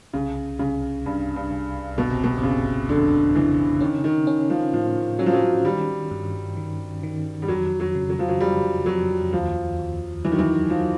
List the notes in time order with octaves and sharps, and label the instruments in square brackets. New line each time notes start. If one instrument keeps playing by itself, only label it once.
[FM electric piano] C2 [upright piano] C#3
[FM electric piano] C2 [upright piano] C#3
[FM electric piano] C2 [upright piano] G2
[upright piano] G2
[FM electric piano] C2
[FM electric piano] G1 [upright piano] B2
[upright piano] C3
B2
C3
[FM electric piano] G1 [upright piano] C#3
[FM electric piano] F2 [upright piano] D3
[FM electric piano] C#3 [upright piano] E3
[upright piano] D#3 [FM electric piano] C#4
[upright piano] D#3
[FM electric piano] C#4
[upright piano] F3
[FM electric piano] A2 [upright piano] F3
[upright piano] F#3 [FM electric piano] C#4
[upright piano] F3
F#3
[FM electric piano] D#3 [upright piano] G3
[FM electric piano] G2
D#3
D#3
[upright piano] G3
[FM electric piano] F2 [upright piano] F#3
[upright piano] F#3
[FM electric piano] C#3
[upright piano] F#3
F3
F#3
[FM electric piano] F2 [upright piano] G3
[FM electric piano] F2 [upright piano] F#3
[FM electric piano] D#2 [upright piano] F3
[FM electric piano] D#2
[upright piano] E3 [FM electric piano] F#3
[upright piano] D#3
E3
[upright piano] F3 [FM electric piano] F#3